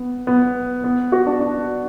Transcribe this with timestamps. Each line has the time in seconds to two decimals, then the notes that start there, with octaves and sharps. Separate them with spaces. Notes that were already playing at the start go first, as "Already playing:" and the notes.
Already playing: B3
0.27 B3
0.84 B3
1.12 F#4
1.27 D4
1.40 D4